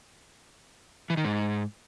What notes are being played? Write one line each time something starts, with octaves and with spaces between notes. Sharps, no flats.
E3
D#3
G#2